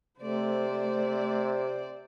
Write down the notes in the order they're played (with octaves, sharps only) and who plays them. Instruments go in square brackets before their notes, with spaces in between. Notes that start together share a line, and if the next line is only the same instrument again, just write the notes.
[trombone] C3 [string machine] A3 [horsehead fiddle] C5 D5